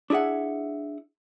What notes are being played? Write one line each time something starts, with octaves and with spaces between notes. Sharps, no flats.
D4 E4 G#4 E5 F#5